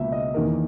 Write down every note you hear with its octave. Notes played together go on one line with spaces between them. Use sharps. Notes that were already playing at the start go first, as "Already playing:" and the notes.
Already playing: C#2 B2 A#3 E5
D#5
E2 D#3 A#3 A#4